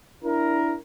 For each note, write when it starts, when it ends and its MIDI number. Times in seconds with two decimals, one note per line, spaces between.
0.25 0.77 62
0.25 0.77 64
0.25 0.77 70